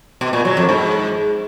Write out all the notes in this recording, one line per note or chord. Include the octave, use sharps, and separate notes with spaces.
B2
A#2
F#3
F2
G#2